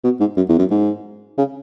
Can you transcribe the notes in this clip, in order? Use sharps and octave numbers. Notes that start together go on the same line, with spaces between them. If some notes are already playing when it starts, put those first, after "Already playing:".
B2
G#2
F#2
E2
F#2
G#2
C#3